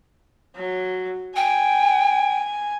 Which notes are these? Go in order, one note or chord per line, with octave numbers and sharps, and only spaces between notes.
F#3
G5 G#5